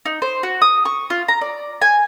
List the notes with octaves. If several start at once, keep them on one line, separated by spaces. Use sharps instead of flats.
D#4
C5
F#4
D#6
C#6
F4
A#5
D5
G#5